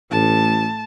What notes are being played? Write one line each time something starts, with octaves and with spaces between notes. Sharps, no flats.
A1 A2 A5